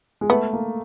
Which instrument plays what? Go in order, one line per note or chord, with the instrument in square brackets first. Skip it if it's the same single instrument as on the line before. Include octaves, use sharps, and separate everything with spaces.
[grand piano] G#3
[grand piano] A3 [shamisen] B3
[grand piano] A#3